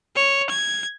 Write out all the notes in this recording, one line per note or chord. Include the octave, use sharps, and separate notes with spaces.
C#5
G#6